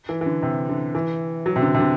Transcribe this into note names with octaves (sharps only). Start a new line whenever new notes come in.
E3
E3
D3
C3
D3
E3
F#3
C3
D3
C3
D3